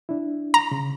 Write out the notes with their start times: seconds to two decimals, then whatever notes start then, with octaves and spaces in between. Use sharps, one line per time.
0.09 D4 E4
0.54 A#5
0.71 C#3